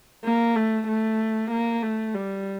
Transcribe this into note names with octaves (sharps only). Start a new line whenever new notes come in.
A#3
A3
A3
A#3
A3
G3